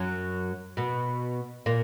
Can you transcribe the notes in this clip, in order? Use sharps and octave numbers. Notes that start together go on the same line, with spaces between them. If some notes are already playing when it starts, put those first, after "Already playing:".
Already playing: F#2 F#3
B2 B3
A#2 A#3